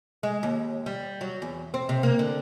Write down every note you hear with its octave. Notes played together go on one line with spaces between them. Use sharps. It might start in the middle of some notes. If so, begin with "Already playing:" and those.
G#3
D#2
G3
F#3
E2
C4
C3
A#3
D3